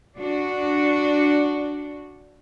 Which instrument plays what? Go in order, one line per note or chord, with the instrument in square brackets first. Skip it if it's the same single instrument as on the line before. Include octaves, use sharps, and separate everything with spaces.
[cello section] D4 F#4